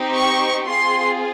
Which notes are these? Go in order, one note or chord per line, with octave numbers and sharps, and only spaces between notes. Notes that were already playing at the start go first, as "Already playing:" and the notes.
Already playing: C4 D#4 G4
C#6
C4 F4 G#4 C6